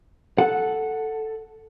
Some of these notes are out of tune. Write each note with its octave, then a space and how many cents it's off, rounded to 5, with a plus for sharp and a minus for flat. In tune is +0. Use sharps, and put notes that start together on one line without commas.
A4 +0 F#5 +0